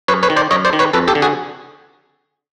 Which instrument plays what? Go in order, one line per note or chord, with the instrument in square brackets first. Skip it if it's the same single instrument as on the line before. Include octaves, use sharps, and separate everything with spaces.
[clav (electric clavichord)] F#2 B4 C#5
B4 C#5
D#3
C5 D5
F#2 C#5 D#5
C5 D5
D#3
B4 C#5
F2 A4 B4
G4 A4
D3
F#4 G#4